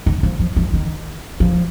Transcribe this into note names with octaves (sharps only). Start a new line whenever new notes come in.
D#3
F3
F3
F3
D#3
F3